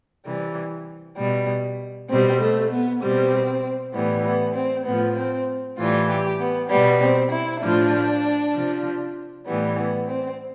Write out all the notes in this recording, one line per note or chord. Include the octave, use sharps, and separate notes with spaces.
C3 E3 G3
B2 G3
B2 G3 C4
A3
B3
B2 G3 C4
A2 E3 G3 B3
B3
C4
A2 F3 B3
C4
A2 E3 G3 F4
G4
B3
B2 G3 B3
C4
E4
A2 F3 D4
C3 F3
A2 E3 G3 B3
B3
C4